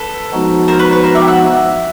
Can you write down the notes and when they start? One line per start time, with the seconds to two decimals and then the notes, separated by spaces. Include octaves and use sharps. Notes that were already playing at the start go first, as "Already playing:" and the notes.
Already playing: A4 B4
0.33 F3 G#3 B3 D#4 F#4
0.68 A#4 C5
0.79 B4 C#5
0.91 B4 C#5
1.04 A#4 C5
1.15 D5 E5
1.22 G5
1.28 E5 F#5